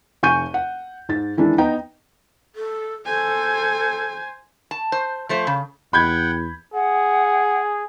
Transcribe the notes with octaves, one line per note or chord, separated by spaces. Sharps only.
F1 G#5 C#6 G6 D#7
F#5
G#2 A6
D#3 E3 G#3 D4 E4
B3 D#4 G5 A#5
A4
A4 C5 G#5
A5
C5
F3 A3 C5
C#3
E2 F#5 G5 B5 G6 G#6
G#4 F#5